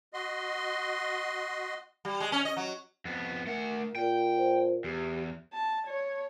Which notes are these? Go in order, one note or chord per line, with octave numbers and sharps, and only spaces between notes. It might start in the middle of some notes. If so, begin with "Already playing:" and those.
F#4 D#5 C6
G3
G#3
C#4
D#5
F#3
F2 B3
A3 A#4 F#5
A#2 G5
C5
E2 G4
A5
C#5